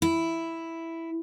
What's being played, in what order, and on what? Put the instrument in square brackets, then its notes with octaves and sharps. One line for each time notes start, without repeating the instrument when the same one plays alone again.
[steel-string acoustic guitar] E4